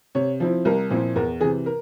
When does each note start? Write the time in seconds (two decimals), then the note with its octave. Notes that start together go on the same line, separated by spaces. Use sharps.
0.15 C3 C#5
0.40 F3 C4 E4
0.65 C2 A#4
0.90 A#2 F3 C4 E4
1.16 E2 A#4
1.41 C3 E3 G#4
1.66 A#4